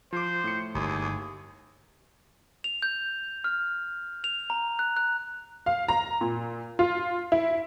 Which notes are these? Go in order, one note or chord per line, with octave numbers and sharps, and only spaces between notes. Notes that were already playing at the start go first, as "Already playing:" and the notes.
F3 C5 D6
A2 C#7
G1 D#2 G#4
F7
G6
F6
F7
A#5
F#6
F#6
F5
A#5
A#2
F4
E4